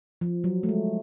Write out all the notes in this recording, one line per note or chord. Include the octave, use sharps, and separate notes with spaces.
F3
F#3
A3
G#3